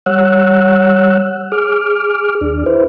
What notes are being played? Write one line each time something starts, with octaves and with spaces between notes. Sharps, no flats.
G3 C#5 F#5 E6 F#6
G#4 D6 F6
D#2 D4
E4 B4 C5